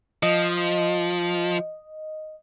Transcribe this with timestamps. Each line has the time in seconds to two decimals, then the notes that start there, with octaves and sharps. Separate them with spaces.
0.23 F3 D#5